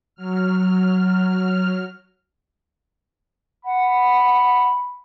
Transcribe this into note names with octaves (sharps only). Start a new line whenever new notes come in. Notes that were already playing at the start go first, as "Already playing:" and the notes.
F#3 F6
F#5 B5